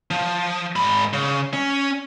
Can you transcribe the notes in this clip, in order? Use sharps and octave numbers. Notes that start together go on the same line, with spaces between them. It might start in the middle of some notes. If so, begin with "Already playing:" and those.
F3
G#2 B5
C#3
C#4